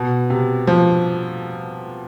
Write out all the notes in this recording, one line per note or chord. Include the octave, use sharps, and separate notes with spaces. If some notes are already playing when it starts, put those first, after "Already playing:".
Already playing: B2
C3
F3